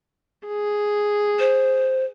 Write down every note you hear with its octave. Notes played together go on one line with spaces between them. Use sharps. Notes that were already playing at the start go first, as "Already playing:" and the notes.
G#4
C5